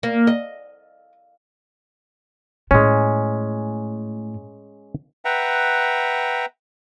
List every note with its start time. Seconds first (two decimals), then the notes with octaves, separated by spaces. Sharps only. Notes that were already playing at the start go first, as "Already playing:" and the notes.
0.03 A#3
0.27 D#5
2.71 A2 G#3 C#4
5.25 B4 E5 F#5 G5 A#5